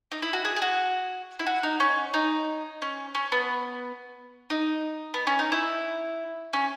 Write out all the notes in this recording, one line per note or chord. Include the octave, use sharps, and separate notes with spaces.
D#4
E4
F#4
G#4
G#4
F#4
E4
F#4
D#4
C#4
D#4
C#4
C#4
B3
D#4
B3
C#4
D#4
E4
C#4